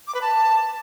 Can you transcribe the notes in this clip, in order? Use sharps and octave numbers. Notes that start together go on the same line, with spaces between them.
D6
B4
A5